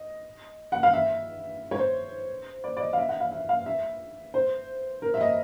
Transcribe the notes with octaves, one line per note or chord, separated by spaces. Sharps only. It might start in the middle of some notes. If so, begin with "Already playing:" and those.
Already playing: D#5
F#5
F5
E5
C#5
C5
D5
D5
D#5
F5
E5
F#5
F5
E5
F5
E5
C5
A#4
E5
D#5